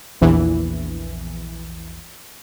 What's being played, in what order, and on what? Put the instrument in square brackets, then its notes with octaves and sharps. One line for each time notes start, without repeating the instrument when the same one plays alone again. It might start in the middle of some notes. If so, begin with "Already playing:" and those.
[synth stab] A#1 E2 E3